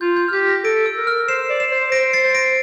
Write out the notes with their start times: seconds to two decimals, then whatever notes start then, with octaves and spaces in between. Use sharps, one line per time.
0.01 F4 G6
0.17 G6
0.28 F6
0.33 G4 G6
0.49 G6 A#6
0.64 A4 A#6 D7
0.86 E6
0.96 A#4
1.07 F6
1.28 C5 C7 E7
1.50 D5
1.60 C7 E7
1.71 C5
1.91 C5 A#6 D7
2.13 A6 C7
2.24 C5
2.34 A#6 D7